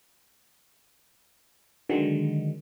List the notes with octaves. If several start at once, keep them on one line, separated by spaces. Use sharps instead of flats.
D3 D#3 F#3 G#3